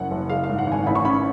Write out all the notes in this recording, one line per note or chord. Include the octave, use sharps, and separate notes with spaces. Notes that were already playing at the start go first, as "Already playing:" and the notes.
Already playing: F#1 F#2 C#4 F#5
F#1
G#3 F5
F5
G#2
F#5
G#1 G#5
A1 B5
C#6
C#4 B5